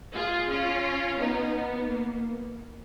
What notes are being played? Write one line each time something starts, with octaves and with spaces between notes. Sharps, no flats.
F4 G#4
C#4 F4
B3 D#4
B3
A#3